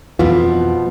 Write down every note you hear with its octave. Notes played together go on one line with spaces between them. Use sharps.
F2 B2 E3 F3 B3 F4